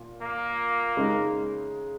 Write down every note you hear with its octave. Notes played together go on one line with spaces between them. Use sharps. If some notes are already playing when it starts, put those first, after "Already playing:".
Already playing: A#2
A#3
C#3 G#3 D#4